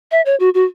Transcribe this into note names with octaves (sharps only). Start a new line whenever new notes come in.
E5
C#5
F#4
F#4